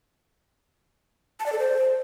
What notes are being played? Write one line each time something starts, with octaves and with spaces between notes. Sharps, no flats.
A5
D5
A4
C5